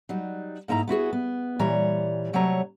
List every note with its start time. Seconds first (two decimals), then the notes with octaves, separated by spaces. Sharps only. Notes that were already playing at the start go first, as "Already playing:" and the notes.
0.09 F#3 G3 D#4
0.68 G#2 A#3 D#4 E4 A#5
0.88 B3 E4 F#4 G#4
1.13 B3
1.59 A#2 E3 G3 C#5 A#5
2.33 C3 F#3 G3 A3 C#5 A#5